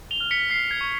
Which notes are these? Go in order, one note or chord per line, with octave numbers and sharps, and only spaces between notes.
F7 G7
F6
B6 C#7
F6 C7
G#6
C#6